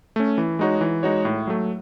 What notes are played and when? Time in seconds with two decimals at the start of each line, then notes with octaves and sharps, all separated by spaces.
0.16 A3 C#4
0.38 E3
0.59 G#3 D#4 F#4 C#5
0.81 E3
1.03 G#3 D#4 F#4 C#5
1.25 A2
1.47 F#3 A3